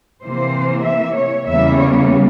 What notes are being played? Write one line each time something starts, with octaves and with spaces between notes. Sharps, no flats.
C3 E3 A#3 C5
E5
C#5
E2 C#3 G3 A#3 E5
C#5